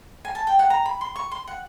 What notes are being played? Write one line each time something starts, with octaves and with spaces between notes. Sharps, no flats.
G#5
A5
G5
F#5
A#5
B5
C6
C#6
C6
F#5